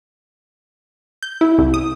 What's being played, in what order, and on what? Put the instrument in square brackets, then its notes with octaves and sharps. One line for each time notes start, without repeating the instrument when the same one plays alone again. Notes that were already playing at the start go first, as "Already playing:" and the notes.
[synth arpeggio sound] G6
E4
C2
D#6